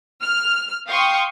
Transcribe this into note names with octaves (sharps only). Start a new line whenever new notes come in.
F6
F5 G5 C6 C#6 D#6